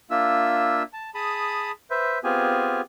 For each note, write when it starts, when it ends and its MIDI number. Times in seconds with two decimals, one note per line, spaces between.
0.10 0.83 58
0.10 0.83 62
0.10 0.83 65
0.10 0.83 76
0.10 0.83 88
0.93 1.10 81
1.15 1.71 68
1.15 1.71 81
1.15 1.71 83
1.15 1.71 87
1.91 2.19 71
1.91 2.19 72
1.91 2.19 76
2.24 2.81 59
2.24 2.81 60
2.24 2.81 65
2.24 2.81 67
2.24 2.81 68
2.24 2.81 80